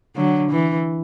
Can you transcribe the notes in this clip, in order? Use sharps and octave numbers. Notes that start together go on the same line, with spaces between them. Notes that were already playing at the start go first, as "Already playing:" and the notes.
D3 F#3
E3